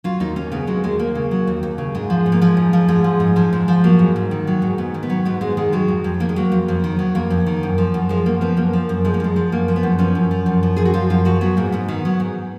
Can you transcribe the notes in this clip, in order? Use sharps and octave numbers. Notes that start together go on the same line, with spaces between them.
F#3 F4
D#2 D#4
D#2 C#4
C#3 B3
F#3 G#3
D#2 G#3
D#2 A#3
C#3
F#3
D#2
D#2
C#3
G#2 G#3
F3
G#2
A#3
F3 G#3
G#2
F3
G#2 G#3
F3
G#2
F3 G#3
G#2
F3
F#3 A#3
G#2
G#2
D#3
F#3
G#2
G#2 B3
D#3
B3
F#3
G#2 B3
G#2 G#3
D#3 G#3
F#3 G#3
F2
F2
D#3 A#3
G#3
F#3 A#3
F2
F2
D#3
F#3
F2 A#3
F2
D#3
F#2
F3
F#2
F3 G#3
F#2 A#3
F3 B3
F#2 A#3
F3
F#2
F3 G#3
A#3
F#2 G#3
F3
F#2 A#3
F3
B3
F#2
F3 C#4
F#2
F3
F#2
F3
F#2 G#4
F#4
F3 F4
F#2 F4
F3 F#4
F#3 B3
G#2 A#3
G#2 B3
D#3
F#3
G#2